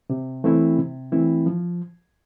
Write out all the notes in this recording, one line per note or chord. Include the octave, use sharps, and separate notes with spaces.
C3
E3 A3 C4 E4
C3
E3 A3 C4 E4
F3